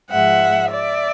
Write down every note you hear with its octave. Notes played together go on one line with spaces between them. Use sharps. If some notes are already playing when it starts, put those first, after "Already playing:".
G#2 F3 G#3 E5 F#5
D5 E5